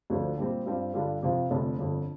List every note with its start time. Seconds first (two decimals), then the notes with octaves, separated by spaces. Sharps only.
0.10 D2 D3 F3 D4 F4
0.38 A#2 G3 C4
0.66 G2 G3 C4 F4
0.94 G2 D3 G3 D4 F4
1.22 F2 C3 F3 C4 F4
1.50 F1 F2 D3
1.78 G1 F2 D3